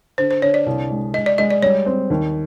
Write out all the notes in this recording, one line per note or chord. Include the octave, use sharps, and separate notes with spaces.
D3 C5
C5
D3 C#5
D5
C2
G#3
G#3 D#5
D5
G#3 D#5
D5
G3 C#5
C4
D#2